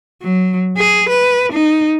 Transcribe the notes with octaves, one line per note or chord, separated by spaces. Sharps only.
F#3
G#4
B4
D#4